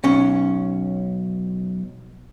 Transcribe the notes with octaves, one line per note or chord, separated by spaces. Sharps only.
B1 C#4